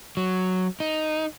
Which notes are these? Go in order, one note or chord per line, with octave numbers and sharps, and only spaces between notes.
F#3
D#4